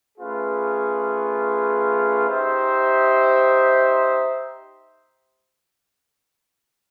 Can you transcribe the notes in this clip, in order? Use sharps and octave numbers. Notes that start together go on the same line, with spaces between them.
A3 C#4 F4 G#4 B4
D#4 G4 C5 E5